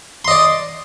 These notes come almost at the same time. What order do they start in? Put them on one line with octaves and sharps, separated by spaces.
C6 D#5 D5